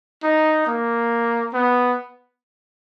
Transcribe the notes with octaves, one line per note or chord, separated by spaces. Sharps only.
D#4
A#3
B3